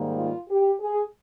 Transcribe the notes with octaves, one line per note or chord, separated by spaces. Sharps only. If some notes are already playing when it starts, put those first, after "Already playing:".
Already playing: G#2 D#3 G3 A#3
F4
G4
G#4